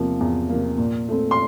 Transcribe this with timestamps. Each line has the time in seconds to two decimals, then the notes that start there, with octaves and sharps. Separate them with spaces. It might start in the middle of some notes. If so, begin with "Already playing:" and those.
Already playing: E2 C3 F3 A#3
0.21 E2
0.49 C3 F3 A#3
0.78 A#2
1.09 A3 C4
1.31 C6